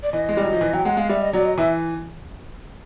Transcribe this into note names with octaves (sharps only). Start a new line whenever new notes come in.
D5
E3 D#5
G#3
G3
F#3
F3
E3
F#3 G5
G#3 F#5
G#3 F5
G3 E5
D#5
F#3 D5
D#5
E3 E5